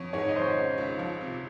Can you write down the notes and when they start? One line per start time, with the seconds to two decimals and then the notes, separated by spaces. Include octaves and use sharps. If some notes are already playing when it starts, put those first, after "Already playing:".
Already playing: F2 C#5
0.13 G#2 C#5
0.28 D#5
0.35 G#1 C5
0.42 C#5
0.56 C#3
0.78 C#2
0.99 F3
1.21 C3